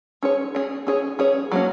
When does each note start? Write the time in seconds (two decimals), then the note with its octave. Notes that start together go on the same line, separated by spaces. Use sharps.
0.23 C#4 G#4 C#5
0.55 C#4 G#4 C#5
0.87 C#4 G#4 C#5
1.19 C#4 G#4 C#5
1.52 F#3 A#3 C#4